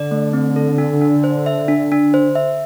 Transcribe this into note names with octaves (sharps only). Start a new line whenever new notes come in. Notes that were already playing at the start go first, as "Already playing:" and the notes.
Already playing: D3 D5
A3
C4
A4
D4
D4
C5
E5
D4
D4
C5
E5